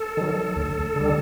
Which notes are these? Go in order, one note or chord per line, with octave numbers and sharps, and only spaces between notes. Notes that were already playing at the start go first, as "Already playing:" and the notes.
Already playing: A4
D#3 F#3
D2
D3 G3